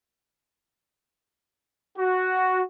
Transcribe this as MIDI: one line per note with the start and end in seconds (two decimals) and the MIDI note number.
1.98 2.62 66